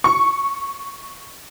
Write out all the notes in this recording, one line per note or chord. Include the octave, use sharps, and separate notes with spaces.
C#6